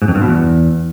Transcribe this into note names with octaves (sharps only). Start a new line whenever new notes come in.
G#2
F2
G2
B2
E2